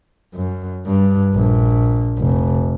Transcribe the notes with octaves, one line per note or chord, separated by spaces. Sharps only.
F#2
G2
A#1
F1